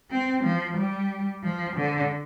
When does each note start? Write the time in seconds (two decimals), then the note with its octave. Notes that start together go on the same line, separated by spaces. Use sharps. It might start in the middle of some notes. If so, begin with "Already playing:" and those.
0.11 C4
0.44 F3
0.77 G3
1.44 F3
1.77 D3